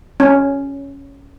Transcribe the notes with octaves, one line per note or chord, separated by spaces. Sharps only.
C#4